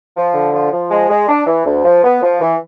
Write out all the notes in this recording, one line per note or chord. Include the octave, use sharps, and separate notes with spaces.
F3
D3
F3
F3
G#3
G#3
D4
E3
D2
F3
B3
F3
E3